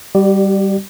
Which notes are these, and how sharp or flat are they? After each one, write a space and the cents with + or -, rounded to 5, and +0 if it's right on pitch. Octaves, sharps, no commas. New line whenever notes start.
G3 +0 G4 -40 D5 +20